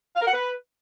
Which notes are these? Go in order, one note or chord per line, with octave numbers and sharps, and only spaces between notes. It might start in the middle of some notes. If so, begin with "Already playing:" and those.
F5
A#4
F#5
B4